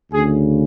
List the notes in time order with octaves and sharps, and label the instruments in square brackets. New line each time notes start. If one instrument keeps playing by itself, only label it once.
[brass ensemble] D2 C#3 G#4